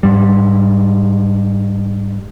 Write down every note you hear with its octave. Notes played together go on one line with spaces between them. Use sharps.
G#2 G3